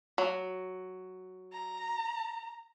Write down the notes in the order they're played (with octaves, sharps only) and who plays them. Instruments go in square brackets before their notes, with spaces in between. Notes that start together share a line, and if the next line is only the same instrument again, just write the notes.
[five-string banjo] F#3
[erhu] A#5